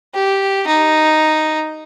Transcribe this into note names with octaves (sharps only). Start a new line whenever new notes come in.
G4
D#4